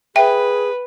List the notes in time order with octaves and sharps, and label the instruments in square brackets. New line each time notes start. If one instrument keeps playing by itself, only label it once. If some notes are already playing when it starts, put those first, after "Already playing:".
[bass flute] G#4 [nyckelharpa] B4 [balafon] E5 G5